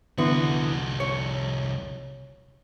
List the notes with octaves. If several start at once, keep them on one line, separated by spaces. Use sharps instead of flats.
C2 D3 E3 B3 F#4
C#5